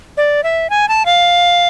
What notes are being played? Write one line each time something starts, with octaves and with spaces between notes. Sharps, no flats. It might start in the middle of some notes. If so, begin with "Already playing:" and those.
D5
E5
G#5
A5
F5